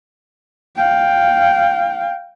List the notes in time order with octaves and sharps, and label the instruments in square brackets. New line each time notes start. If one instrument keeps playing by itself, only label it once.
[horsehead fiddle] F5 G5